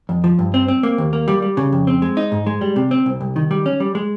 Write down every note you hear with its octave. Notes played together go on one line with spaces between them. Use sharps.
F2
F3
G2
C4
C4
A#3
D#2
A#3
G3
G3
C#3
F2
C4
G#3
D#4
G#2
G#3
G3
C3
C4
C2
C2
D#3
G3
C#4
G3
G#3